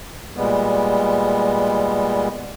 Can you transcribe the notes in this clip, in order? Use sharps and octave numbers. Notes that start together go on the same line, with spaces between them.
A#2 G3 G#3 B3